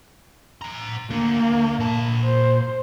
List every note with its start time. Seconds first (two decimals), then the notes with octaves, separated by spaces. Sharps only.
0.62 C5 A#5
1.11 A3 A#3 D4
1.79 A#2 A5
2.25 C5